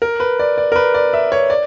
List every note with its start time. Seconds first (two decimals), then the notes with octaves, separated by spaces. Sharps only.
0.02 A#4
0.20 B4
0.39 D5
0.58 D5
0.72 A#4
0.76 B4
0.94 D5
1.13 E5
1.32 C#5
1.50 D5